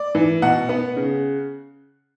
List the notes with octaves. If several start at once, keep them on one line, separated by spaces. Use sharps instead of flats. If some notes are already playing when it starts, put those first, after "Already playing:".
Already playing: D5
E3
B2 F#5
B3
C#3